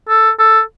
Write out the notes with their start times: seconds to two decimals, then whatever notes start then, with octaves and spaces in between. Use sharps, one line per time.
0.09 A4
0.39 A4